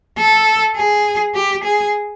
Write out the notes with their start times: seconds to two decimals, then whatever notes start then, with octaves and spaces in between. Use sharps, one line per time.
0.18 A4
0.77 G#4
1.35 G4
1.64 G#4